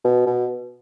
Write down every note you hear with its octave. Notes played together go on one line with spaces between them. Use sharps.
B2
B2